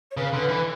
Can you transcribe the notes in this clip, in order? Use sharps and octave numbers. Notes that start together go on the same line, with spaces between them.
C#5
C#3 B4
D3
E3